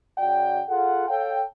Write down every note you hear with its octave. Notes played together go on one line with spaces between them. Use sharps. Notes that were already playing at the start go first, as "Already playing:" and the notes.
C#3 F#4 D5 F#5 G5
F4 G#4 A4 F#5
A4 C#5 F5 G5